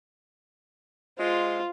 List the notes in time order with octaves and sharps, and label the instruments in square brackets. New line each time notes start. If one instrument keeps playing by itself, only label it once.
[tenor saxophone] G#3 [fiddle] F4 [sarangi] C5